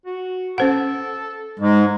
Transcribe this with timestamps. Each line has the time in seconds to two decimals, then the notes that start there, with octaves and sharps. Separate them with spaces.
0.06 F#4
0.58 C#4 A4 C5 F#5
1.59 G#2 G#3